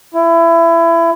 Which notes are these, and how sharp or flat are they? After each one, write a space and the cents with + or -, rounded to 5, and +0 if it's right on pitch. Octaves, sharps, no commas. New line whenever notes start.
E4 +25